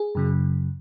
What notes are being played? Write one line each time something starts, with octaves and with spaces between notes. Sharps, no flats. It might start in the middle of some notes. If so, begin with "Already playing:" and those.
Already playing: G#4
F#2 C#3 F#3